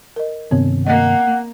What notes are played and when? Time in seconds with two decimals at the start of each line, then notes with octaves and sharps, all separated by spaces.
0.16 A#4 D#5
0.51 G2 C3 D#3 B3 C4 C#5
0.87 A#3 D#5 F#5